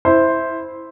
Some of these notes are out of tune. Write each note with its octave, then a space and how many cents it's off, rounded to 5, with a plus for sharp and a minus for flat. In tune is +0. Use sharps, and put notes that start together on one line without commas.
E4 -10 C5 +0